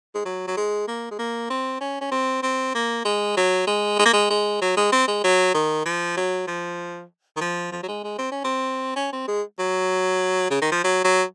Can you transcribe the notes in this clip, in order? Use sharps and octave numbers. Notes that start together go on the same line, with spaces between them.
G#3
F#3
F#3
G#3
A#3
G#3
A#3
C4
C#4
C#4
C4
C4
A#3
G#3
F#3
G#3
G#3
A#3
G#3
G#3
F#3
G#3
C4
G#3
F#3
D#3
F3
F#3
F3
D#3
F3
F3
F#3
G#3
G#3
C4
C#4
C4
C#4
C4
G#3
F#3
C#3
D#3
F3
F#3
F#3